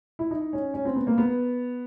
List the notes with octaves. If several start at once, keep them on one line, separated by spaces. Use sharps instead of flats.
E4
D#4
C#4
C#4
C4
B3
A#3
B3